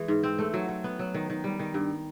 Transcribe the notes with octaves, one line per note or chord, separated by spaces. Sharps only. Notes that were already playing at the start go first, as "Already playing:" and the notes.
Already playing: E3 G#3
G#2
C4
A3
F#3
F#3
B3
F#3
D#3
D#3
G3
D#3
G2